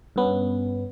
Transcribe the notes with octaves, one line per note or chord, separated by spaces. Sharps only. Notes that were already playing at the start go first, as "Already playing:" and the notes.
G2 B3 C#4